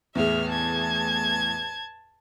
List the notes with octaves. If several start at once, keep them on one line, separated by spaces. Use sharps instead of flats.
E2 A2 G#4 E5 F6
A5 G#6